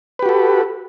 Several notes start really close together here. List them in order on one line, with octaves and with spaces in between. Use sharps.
B4 G4 F#4 A4